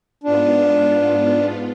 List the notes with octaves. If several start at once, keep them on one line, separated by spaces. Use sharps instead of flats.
G#2 B3 D4 F4